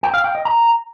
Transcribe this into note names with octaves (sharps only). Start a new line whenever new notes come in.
G5
F5
G5
D#5
A#5